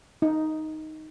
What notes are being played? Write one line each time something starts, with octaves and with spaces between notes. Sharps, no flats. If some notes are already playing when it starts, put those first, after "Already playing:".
D#4